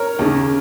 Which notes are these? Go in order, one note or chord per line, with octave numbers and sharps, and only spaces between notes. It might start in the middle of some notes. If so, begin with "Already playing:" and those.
Already playing: A#4 C#5
D#2 C#3